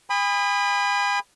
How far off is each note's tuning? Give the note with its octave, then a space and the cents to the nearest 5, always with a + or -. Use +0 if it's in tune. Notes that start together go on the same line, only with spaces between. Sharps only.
G#5 -40 B5 +10 D#6 -10